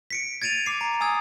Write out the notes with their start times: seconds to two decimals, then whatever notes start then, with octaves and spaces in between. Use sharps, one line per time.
0.11 B6 C#7 D7
0.42 G#6 A6 D7 D#7 F7
0.66 D6 C7
0.81 A#5
1.01 G#5 D#6 E6 G#6